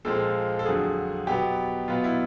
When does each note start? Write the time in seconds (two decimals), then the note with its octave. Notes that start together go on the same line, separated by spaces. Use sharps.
0.05 A#2 F3 G#3 C4 A4
0.59 A4
0.66 F2 D3 F#3 G#4
1.27 B2 F#3 B3 G4
1.88 B2 F#3 B3 F4
2.04 E4